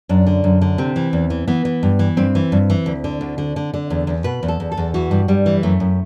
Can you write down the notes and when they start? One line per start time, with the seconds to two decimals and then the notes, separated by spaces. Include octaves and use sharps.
0.09 F#2 D4
0.26 D3
0.44 F#2
0.61 D3
0.78 C3 C4
0.96 E3
1.13 E2
1.30 E3
1.47 E3 B3
1.65 E3
1.83 G2
1.99 E3
2.17 G2 C4
2.35 E3
2.52 G2
2.70 E3
2.86 D2
3.04 D3
3.21 D2
3.38 D3
3.56 D3
3.74 D3
3.90 E2
4.07 E2
4.24 B2 B4
4.43 E2
4.48 A4
4.60 E2
4.72 A4
4.77 E2
4.94 E3 F#4
5.11 G2
5.28 G2 G3
5.46 E3
5.63 F#2 A3
5.80 F#2